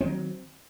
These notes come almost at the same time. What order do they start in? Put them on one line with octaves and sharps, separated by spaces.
C4 D#3 F#3